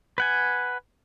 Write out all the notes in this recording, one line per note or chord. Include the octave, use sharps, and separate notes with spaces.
B4 F#5 G#5